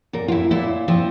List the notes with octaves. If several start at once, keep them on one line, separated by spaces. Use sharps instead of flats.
A#2 A#4
F4
E4
A#2 E4
F3 C4